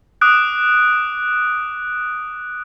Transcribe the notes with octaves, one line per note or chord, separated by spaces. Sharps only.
D6 D#6 F#6 D7